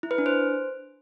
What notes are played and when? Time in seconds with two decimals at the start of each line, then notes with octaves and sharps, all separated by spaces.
0.03 E4
0.11 B4
0.18 D4
0.26 C5